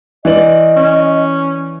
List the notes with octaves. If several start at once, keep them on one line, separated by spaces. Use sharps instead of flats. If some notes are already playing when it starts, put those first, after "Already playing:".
E3 D5 D#5 F#7
C#4